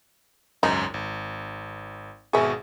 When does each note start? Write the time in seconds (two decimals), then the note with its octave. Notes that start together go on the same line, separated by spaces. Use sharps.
0.63 G#1 C#2 F#2 D#4
0.94 G#1
2.33 G#1 B2 G#4 E5 C#6